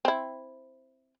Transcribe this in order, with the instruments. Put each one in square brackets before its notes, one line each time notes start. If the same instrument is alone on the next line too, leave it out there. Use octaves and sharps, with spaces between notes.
[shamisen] C4 E4